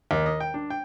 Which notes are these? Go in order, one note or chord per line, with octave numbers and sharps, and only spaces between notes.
D#2
D#5
G5
D4
G5